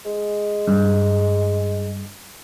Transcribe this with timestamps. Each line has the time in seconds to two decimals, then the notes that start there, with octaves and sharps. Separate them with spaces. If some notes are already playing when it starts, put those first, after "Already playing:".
0.05 G#3
0.67 G2